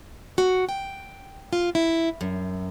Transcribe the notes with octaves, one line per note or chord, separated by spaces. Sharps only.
F#4
G5
F4
E4
F#2